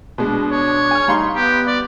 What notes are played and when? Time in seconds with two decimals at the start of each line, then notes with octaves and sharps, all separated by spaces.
0.18 B2 G#3 D4
0.51 C#5
0.91 G#5 F6
1.08 G3 D#4 F5 C6
1.35 B3 G4
1.67 D5